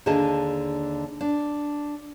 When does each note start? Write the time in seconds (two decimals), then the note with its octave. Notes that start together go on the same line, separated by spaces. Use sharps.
0.06 D#2 D3 D4 G#4 D#5 A5
1.21 D4